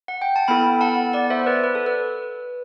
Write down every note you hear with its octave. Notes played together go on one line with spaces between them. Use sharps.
F#5
G5
A5
B3 E4 A4 G5 B5
F#5 A5
D5 F#5
C5 E5
B4 D5
B4
A4
B4